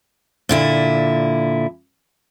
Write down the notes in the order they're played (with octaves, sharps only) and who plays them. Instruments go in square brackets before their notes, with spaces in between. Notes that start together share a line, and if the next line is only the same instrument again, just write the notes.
[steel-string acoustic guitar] A#2 D3 E4